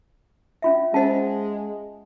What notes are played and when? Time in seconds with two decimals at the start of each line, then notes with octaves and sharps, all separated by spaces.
0.62 C#4 F4 E5
0.94 G#3 C#4 C5 D#5 F#5 A5